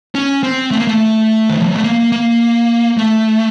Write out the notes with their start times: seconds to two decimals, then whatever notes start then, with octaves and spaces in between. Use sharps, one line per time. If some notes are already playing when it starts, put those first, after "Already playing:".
0.15 C#4
0.43 C4
0.71 A3
0.79 A#3
0.87 A3
1.49 D#3
1.59 F3
1.67 F#3
1.75 A3
1.84 A#3
2.12 A#3
2.97 A3